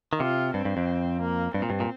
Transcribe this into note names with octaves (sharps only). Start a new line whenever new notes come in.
D#3
C3 F4
G2 C4
G2
F2
A#3
G2 C4
A#2
G2
A#2